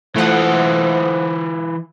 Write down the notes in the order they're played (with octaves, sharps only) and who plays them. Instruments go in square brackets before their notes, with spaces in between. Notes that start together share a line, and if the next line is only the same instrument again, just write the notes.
[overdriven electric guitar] E3 F4 [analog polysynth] A3 F#5 D#6 [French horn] C5